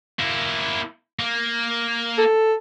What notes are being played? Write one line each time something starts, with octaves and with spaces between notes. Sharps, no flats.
A#3 E4
A#3
A4